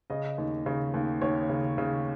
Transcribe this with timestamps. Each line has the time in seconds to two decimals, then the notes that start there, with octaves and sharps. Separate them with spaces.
0.10 C#3 D#5
0.38 D#2
0.66 C#3
0.94 D#2
1.21 D#2 C#5
1.49 C#3
1.78 C#3